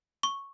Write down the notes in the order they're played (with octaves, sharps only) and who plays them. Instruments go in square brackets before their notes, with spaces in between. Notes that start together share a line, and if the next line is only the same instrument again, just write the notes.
[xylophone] C#6